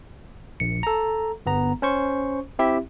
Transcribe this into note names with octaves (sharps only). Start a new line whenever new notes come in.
A#1 C#7
A4 A#5
G1 B3 A#5
C#4 C5 C#6
C4 E4 G4 E5